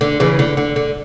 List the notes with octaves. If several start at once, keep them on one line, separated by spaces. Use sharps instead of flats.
D3
C#3 E3
D3
D3
D3